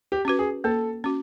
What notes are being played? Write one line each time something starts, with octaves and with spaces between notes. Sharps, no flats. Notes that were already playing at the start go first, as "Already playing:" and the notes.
G4
C#4 F#4 B4
G#4
A#3 A4
C#4 F#4